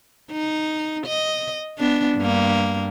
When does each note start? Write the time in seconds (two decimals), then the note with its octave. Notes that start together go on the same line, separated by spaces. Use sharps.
0.31 D#4
1.06 D#5
1.77 B3 D4
2.18 G2 A#3